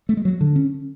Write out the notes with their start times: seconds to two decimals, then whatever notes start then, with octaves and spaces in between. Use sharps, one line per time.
0.09 A3
0.17 G#3
0.25 F#3
0.41 D3
0.56 C#4